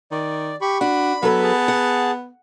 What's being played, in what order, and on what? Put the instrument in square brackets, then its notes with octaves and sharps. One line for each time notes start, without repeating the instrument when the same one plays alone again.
[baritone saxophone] D#3 [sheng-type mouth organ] D5
[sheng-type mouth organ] G4 B5 C#6
[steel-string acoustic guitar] D4 [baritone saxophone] F#4 [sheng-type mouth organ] B5
[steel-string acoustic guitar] F#3 A4 B4 [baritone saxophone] B3
[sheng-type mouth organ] G#4 A5
[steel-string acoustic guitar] F#5